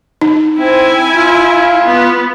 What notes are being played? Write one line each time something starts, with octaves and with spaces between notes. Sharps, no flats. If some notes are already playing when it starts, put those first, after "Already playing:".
D#4
C4 E4 G#5
F4
B3